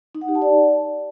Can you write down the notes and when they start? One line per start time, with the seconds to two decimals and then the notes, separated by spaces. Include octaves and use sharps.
0.15 D#4
0.21 F#5
0.28 G4
0.35 A5
0.42 D5